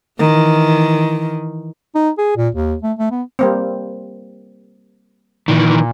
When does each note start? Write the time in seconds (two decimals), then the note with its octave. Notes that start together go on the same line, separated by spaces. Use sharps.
0.19 D#3 E3
1.95 D#4
2.18 G#4
2.37 A#2
2.55 D#2
2.83 A3
2.98 A3
3.11 B3
3.39 G3 A#3 C4
5.48 A#2 D#3 E3